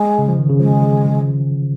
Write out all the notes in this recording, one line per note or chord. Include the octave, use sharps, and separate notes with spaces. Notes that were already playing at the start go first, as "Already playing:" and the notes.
Already playing: G#3
C#3
F3
D#3
C#3
F3 G#3